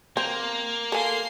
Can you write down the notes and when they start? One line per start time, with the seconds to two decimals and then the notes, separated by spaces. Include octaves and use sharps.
0.17 A#3 C4
0.92 A4 F5 G#5 C6